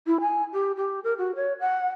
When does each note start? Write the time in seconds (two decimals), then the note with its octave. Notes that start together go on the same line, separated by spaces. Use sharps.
0.07 E4
0.21 G#5
0.53 G4
0.77 G4
1.04 A#4
1.18 F#4
1.36 C#5
1.60 F#5